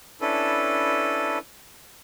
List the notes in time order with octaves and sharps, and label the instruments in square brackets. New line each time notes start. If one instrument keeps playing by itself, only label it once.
[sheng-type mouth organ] C#4 D4 E4 A4 B4